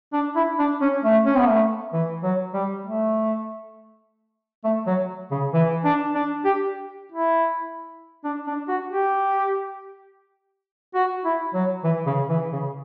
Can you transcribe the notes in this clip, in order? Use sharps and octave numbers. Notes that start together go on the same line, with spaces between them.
D4
E4
D4
C#4
A3
C#4
B3
A3
E3
F#3
G3
A3
A3
F#3
C#3
E3
D4
D4
G4
E4
D4
D4
F#4
G4
F#4
E4
F#3
E3
C#3
E3
C#3